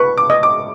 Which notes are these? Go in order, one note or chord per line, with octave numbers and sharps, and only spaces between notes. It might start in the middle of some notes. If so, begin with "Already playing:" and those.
Already playing: B4 C#6
D6
D#5
D6